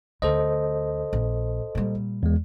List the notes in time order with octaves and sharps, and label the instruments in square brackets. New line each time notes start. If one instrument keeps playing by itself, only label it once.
[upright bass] D2 [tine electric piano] A4 C5 D#5
[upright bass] A#1
A#2 G3
[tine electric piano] E2 G#3